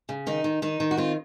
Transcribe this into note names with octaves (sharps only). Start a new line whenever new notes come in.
C#3
D#3 D#4
D#3
D#3 D#4
D#3
F#4
C4 F4